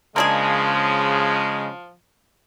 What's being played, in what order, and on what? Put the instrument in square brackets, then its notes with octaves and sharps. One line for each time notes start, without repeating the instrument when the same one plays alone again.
[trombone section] C#3 G#3 [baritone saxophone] F3 [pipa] A#3 D4 G#4